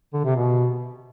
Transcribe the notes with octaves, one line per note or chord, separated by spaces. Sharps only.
D3
C3
B2